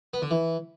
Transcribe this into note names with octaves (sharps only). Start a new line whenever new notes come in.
B3
D3
E3